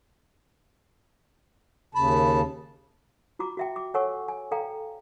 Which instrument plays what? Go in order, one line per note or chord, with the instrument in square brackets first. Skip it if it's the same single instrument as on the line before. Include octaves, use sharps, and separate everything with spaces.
[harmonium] D#2 C#3 A5 [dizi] B5
[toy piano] F4 F#4 A#5 D6
F#4 E5 G5
D6
A4 C#5 F#5 G#5 C#6 E6
G#5
A4 D5 F5 G5 A#5